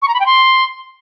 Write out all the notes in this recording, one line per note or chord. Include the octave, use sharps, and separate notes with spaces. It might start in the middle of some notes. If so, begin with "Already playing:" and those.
C#6
A#5
B5
G5
C6